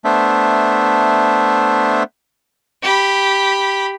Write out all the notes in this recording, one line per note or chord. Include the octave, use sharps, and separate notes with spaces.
A3 B3 D4 C5 E5
G4 B5